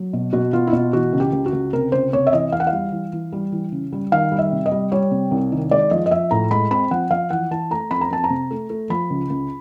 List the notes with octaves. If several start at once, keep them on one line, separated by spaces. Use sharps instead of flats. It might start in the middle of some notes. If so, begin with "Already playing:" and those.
Already playing: F#3
B2
B2 F#4
B3 F4
E4
B2 F4
E3 F#4
C#2
G4
C#2
F#4
C#2
C3 A#4
C#2 C5
C3 C#5
E5
E3 D#5
E2 F5
F#5
F5
G3
E3
E3
G3
E3
C#3
G3
D#3 F5
G3
E5
C3
D#5
G3
G3 C#5
C3
C2
D#3
G#3 D5
F3 D#5
D#5
F3 E5
A2 A#5
G#3 B5
C4 B5
F3 F#5
F3 F5
E3 F#5
E3 A5
A3 A#5
F2 B5
A#5
F2 A5
A#5
C3
A3
A3
F3 B5
C#2
C#2